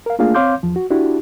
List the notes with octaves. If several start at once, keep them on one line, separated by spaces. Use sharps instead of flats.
A#4 F5
A3 A#3 D4 F4 G#4 F5
C4 C#5 F5 C6 D6 G6
E2 F3
F#4
D4 E4 F#4 G4